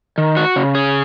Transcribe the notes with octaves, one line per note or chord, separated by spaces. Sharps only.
D#3
F#4
C#3
G#4